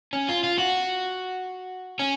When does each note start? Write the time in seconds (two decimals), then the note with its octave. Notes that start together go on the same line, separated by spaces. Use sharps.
0.13 C#4
0.29 F4
0.44 F4
0.59 F#4
1.99 C#4